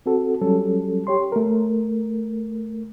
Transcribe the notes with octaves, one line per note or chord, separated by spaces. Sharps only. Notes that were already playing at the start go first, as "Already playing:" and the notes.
C4 F#4 A4
F#3 G3 C#4 A4
G4 C#5 C6
A3 A#4